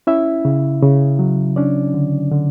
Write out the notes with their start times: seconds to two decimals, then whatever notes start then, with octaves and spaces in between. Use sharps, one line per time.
0.07 C#4 E4 E5
0.45 C#3
0.83 C#3
1.19 F#3
1.56 C#4 D4 D5
1.94 D3
2.32 D3